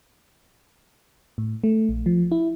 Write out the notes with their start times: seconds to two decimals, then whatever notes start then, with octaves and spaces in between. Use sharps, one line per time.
1.38 A2
1.64 A3
1.89 A#1
2.06 F3
2.32 E4